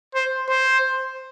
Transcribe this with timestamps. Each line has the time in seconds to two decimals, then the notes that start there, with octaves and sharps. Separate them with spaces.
0.15 C5
0.49 C5